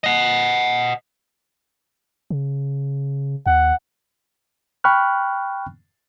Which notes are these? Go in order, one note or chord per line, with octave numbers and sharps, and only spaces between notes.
D#5 F#5
C#3
D#2 F#5
G5 B5 C#6 F6 F#6